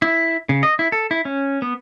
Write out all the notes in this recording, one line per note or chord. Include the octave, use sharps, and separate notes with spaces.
E4
C#3
D#5
E4
A4
E4
C#4
B3